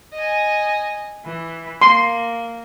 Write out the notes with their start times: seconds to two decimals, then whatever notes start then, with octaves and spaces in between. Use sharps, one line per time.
0.14 D#5 G#5
1.24 E3
1.82 A#3 C6